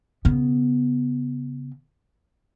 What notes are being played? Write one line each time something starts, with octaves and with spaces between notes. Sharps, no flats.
C#3 B3